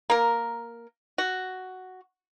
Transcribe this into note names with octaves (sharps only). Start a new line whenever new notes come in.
A#3 A#4
F#4